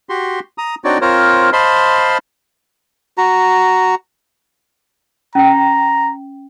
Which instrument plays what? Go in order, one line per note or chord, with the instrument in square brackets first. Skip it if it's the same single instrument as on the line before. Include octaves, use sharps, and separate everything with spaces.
[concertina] F#4 G4 C6
A#5 D#6
C4 D4 D#4 F#4 C#5 D5
C4 F4 A#4 C5 C#5
C5 D#5 F5 A5 B5 C6
[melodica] F#4 A#5
[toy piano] C#4 G5 [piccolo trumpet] A#5